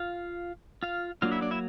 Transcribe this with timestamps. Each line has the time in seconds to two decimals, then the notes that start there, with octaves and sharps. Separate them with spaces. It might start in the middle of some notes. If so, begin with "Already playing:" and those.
Already playing: F4 F5
0.83 F4 F5
1.22 F#3 A#3 D4 F4 F5
1.32 E4 E5
1.41 D4 D5
1.51 E4 E5